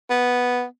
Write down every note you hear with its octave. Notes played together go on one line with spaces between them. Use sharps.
B3